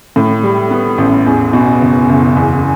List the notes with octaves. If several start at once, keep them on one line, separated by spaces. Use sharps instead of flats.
A2
G3
B3
A1
E2
B2
F#1
F#1
E2